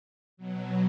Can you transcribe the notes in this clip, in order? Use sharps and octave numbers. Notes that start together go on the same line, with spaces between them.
B2 F#3